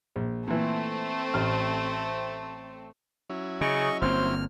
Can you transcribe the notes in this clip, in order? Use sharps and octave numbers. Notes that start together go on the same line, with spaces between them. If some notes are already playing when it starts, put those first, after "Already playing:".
A#1
A#2 E3 A3 C4
A1 F6
F#3 C#4 E4
C#3 G#4 D#5 C#6
G1 A#3 C4 C5 F6